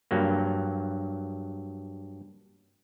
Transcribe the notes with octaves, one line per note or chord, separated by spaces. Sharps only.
G2 F#3 A#3